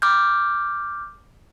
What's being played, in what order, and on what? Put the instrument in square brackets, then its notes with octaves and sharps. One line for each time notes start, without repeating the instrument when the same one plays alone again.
[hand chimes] D6 F6 G6